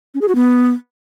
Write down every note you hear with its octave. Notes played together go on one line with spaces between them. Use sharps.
C#4
G#4
F#4
B3